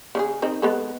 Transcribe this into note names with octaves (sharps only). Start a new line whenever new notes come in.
C#3 D#4 G#4
D#3 C4 D#4
G#3 B3 A4